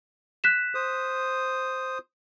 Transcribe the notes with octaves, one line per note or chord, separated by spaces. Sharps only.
F#6 B6 E7
C5 D#6